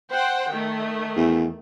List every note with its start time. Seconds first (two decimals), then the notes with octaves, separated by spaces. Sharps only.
0.11 C5 F#5 G5
0.50 D#3 A3
1.16 E2